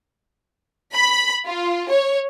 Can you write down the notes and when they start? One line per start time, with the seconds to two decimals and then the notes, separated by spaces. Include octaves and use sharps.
0.94 B5
1.46 F4
1.90 C#5